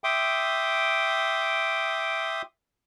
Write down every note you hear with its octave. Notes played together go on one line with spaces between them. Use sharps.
E5 G5 C6 D6 D#6